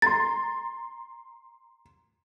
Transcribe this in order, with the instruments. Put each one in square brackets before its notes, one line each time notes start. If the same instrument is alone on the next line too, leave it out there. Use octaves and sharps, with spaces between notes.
[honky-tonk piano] A#5 C6 [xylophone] A6